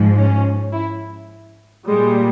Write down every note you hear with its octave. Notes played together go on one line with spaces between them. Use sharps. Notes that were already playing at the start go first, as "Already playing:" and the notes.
Already playing: G#2 F3
C#4
E4
A#2 G3 G#3